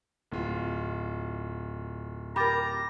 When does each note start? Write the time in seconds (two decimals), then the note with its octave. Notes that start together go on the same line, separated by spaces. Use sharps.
0.31 D1 F4
2.36 G4 A#4 A#5 B5 D6 A6